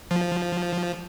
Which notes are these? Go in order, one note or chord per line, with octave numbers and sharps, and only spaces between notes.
F3